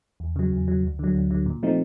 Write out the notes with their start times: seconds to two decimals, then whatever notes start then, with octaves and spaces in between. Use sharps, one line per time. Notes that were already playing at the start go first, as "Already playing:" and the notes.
0.20 E2
0.36 C#3 F#3
0.52 E2
0.68 C#3 F#3
0.83 D2
0.99 D3 F#3
1.15 D2
1.31 D3 F#3
1.46 A#2
1.63 F3 A3 C4 D#4